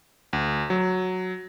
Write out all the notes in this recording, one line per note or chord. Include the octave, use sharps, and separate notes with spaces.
D2
F#3